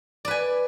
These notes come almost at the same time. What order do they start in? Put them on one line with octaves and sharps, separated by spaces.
D5 B4 G#5